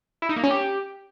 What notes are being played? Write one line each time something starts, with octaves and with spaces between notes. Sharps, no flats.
E4
D#4
A#3
C#4
G4